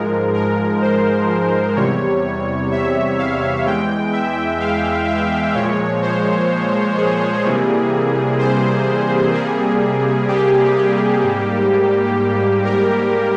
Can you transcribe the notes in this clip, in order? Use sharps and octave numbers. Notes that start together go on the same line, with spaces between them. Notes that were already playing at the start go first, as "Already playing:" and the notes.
Already playing: G#2 F3 G#3 A#4
A#4
C5
E2 C3 G3 C#5
E5
F5
E2 E3 G#3 G5
E5
F5
E5
A#2 F3 G#3 C#5
C5
G#4
C3 E3 G3 A#3
C5
C3 G3 A#3 G#4
G4
G4
G#2 G3 A#3
A#4